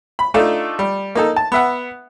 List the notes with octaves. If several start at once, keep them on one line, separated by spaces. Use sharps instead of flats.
B5
A3 D4 D#4 F4 A4
G3
A#3 D#4 A4
A5
B3 E5 F#5